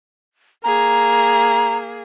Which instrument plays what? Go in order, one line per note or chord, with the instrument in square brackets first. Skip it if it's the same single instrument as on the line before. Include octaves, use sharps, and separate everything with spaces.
[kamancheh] A#3 G#4 [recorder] A#5